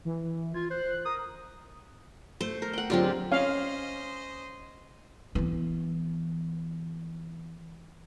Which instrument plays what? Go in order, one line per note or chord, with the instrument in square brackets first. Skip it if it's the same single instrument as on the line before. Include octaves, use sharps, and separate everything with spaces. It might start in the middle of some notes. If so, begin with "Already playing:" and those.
[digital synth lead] E3
[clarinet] F4 [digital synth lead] G#6
[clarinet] C5 [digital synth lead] F#6
[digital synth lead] A#4 [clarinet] D#6
[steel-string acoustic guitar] A3 [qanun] C5
[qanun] A#4
F#5 G5
[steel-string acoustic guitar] D2 F#3 C4 [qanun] G#3 F4 G4
[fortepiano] C#4 [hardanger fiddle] C5 D#5 [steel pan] F5
[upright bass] E3 B3